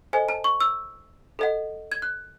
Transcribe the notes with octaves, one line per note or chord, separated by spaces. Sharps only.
A4 C5 D#5 G#5
A5
C#6
E6
A4 D#5 F#5
G#6
F#6